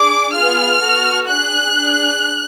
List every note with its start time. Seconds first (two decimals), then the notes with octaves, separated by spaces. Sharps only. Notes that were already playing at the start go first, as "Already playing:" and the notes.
Already playing: D4 G#4 D6
0.34 B3 F4 G#4 F6
0.82 B3 F#4 A4
1.29 D4 G#4 F#6
1.76 D4 G#4